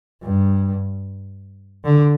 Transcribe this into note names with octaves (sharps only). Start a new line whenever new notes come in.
G2
D3